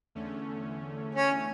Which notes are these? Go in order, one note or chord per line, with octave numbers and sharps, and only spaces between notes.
E2 D3 A3 C#4
C#4